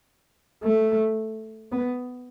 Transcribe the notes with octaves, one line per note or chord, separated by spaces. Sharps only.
A3
B3